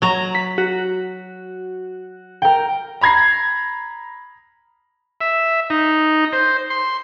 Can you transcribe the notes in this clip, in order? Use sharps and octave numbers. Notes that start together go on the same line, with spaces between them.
F#3 A#5
B6
F#4
A#4 G5
A#5 B5 G#6 A#6 C7
E5
D#4
C5
C6